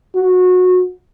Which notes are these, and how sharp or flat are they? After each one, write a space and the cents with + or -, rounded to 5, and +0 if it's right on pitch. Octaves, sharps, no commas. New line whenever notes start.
F#4 -20